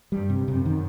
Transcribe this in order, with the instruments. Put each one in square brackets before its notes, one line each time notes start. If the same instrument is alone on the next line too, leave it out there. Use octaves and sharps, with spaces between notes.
[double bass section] G2 [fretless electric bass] G3
[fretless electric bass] C3
[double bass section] F#2 [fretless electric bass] C3
[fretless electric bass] D#3